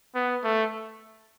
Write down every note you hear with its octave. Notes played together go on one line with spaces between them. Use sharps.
B3
A3